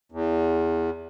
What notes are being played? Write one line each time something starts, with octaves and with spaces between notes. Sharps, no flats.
E2